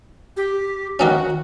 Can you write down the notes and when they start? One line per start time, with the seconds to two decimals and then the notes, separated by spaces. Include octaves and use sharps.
0.37 G4
0.99 D#3 A#3 C#4 F#4